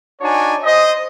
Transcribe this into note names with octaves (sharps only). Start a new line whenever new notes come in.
D4 D#4 F#4 C#5 G#5
C5 D#5